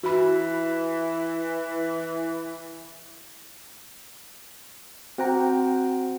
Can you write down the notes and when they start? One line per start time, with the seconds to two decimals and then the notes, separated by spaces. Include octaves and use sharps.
0.03 E3 F#4 B5
5.18 C4 F#4 C5 F#5 G5 A#5